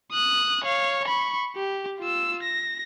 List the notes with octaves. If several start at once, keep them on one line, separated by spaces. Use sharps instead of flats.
D#6 F#6
C#5 F5
B5 C#6
G4
F4 E6
A#6